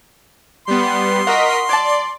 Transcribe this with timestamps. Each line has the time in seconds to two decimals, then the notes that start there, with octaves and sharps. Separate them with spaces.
0.68 G3 B3 C6
1.27 F4 F#4 A#4 D#5 B6
1.69 F#3 D5 A5